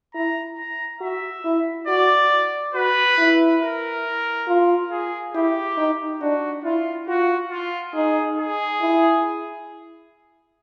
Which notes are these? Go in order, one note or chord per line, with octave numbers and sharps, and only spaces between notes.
E4 A#5
A#5
F#4 E5
E4
F#4 D5
F#4 B4
E4
A#4
F4
G#4
E4 G4
D#4
D4 F#4
E4 F4
F4 F#4
F4
D#4 G#4
G#4
E4